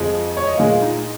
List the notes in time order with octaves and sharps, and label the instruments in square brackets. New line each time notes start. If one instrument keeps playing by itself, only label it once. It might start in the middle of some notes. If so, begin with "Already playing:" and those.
Already playing: [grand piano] F2 F3 G#3
C#5
D#5
A#2 G#3 F5
F4
D#4